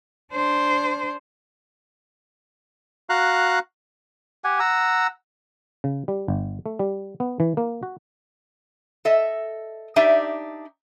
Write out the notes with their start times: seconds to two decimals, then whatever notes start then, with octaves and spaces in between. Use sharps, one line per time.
0.33 D4 C5
3.10 F#4 F5 A#5 F#6
4.44 G4 F#5 G#5
4.60 F#5 A#5 E6
5.84 C#3
6.08 G3
6.28 G1
6.66 A3
6.79 G3
7.20 B3
7.40 E3
7.57 A#3
7.83 F#4
9.05 A4 D#5 E5
9.96 D4 D#4 G4 D5 E5